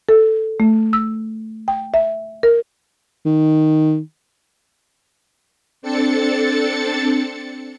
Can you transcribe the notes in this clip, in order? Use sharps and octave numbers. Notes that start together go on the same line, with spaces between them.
A4
A3
E6
G5
E5
A#4
D#3
C4 D4 A4 A6 C#7